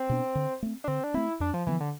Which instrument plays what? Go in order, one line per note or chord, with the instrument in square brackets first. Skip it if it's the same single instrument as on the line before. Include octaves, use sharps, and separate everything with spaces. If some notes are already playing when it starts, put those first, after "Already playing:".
Already playing: [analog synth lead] C4
[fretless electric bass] B2 B3 D4
D3
A3 C4
[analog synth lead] D4
[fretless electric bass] D3 [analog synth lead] C4
[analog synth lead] D4
[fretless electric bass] A3 C4 [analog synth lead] E4
[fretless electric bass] F2 [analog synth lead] D4
[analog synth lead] F3
[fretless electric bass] D3 F3 B3 [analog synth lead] E3
[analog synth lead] D3